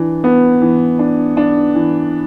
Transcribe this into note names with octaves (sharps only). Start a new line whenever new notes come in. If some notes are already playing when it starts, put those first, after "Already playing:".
Already playing: E3 D4
B3
E3
D4
D4
E3